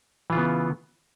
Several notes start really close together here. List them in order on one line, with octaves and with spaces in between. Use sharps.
E3 F4 C#3 B3